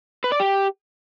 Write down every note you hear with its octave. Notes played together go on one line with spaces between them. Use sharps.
B4
D5
G4